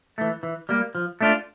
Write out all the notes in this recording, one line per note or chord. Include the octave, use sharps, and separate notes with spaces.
E3 A3
E3
G3 A#3
F3
A3 D4 F4